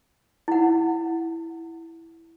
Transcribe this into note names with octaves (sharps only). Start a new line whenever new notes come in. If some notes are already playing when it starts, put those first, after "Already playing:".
E4 F#5